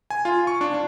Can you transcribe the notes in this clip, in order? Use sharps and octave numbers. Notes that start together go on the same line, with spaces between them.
G#5
F4
C#6
D4
D4